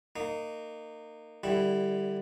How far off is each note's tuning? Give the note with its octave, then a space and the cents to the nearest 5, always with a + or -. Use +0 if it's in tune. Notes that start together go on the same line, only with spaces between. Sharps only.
A#3 -20 D#4 -20
D3 +25 G3 +0 E4 +0